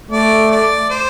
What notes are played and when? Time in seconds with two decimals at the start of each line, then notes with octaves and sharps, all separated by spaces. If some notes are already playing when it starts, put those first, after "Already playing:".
0.11 A3 D5
0.51 D5
0.90 C5